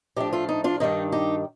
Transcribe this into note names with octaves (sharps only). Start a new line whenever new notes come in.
A2 F3 A3 D4 D#4 G4
F4 A4
D#4
D4 F4
G2 D#3 G3 D4 D#4
D#4 G4